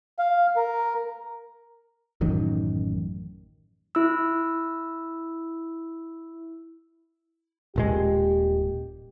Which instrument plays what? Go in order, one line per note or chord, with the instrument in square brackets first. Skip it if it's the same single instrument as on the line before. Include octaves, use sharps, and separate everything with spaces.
[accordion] F5
A#4
[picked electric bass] A1 F#2 D#3
[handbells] E4 E6
[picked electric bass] D#1 A#2 G#3 [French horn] G4